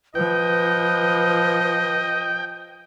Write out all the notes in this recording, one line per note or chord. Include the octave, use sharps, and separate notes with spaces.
F3 B4 D#5 G5